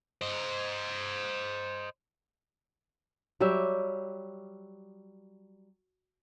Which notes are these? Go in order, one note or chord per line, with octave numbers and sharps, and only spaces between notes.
C5 D#5
F#3 G3 G4 E5